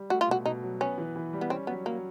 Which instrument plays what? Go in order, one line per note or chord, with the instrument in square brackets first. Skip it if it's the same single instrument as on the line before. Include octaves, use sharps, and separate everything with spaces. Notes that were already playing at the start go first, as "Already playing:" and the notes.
Already playing: [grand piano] G3
[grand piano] A3 [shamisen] F#4
[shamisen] F4
[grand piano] B2 [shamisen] F#4
[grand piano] B2 [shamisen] D#4
[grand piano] F#3
[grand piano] B3 [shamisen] C#4
[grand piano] E3
E3
G3
[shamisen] B3
[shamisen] C4 [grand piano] C#4
[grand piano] F#3 [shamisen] B3
[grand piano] F#3 [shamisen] A#3